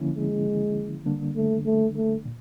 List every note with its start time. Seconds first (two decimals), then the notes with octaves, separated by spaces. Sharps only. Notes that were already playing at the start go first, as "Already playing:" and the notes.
Already playing: D3 F3 A#3 C#4 E4
0.16 G#3
1.05 D3 G3 A#3 D4
1.36 A3
1.66 A3
1.96 A3
2.25 A#2